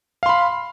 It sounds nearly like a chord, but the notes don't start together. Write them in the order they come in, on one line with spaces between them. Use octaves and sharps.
F5 C6 B5